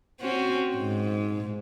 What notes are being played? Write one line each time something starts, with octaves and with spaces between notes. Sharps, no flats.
C4 C#4 F#4
G#2